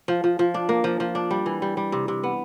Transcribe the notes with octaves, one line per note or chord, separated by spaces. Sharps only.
F3
F3
F3
D4
A#3
F3
F3
D4
G3
E3
G3
G3
C3
C3
B3